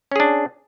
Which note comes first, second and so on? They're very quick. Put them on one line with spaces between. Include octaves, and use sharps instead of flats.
C#4 G#4 D4